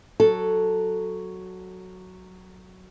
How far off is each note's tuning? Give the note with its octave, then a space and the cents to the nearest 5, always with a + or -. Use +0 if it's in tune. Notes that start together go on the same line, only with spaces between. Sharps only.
F#3 +0 A4 +0